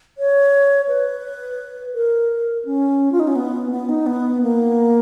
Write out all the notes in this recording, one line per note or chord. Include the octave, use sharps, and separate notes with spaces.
C#5
B4
A#4
C#4
F4
D#4
C#4
B3
B3
D#4
B3
A#3